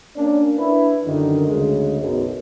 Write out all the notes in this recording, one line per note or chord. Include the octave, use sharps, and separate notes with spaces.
A#3 C#4 D4
D4 E4 B4
F#2 D3 D#3
D2 C#3 G#3
B1 F#2 B2